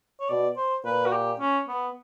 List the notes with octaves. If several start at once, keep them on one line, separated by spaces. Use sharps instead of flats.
C#5
B2 D5
C5
A#2 B4
F#4
G4
C#4
B3